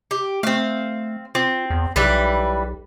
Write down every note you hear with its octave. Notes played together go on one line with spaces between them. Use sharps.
G4
A3 C4 F5
C4 F4
E2
B1 E3 G3 B4